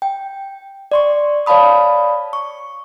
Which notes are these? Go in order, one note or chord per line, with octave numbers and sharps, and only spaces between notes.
G5
D5 C6 C#6
C#5 D5 F5 A5 B5 D#6
C#6